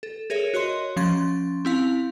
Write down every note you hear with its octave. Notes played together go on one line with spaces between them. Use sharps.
A4
G#4 A#4 C#5 E5
F#4 C#5 D#5 C6
F3 C#4 C6 C#6 A6
C4 E4 F5